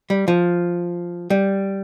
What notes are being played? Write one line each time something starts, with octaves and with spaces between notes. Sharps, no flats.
G3
F3
G3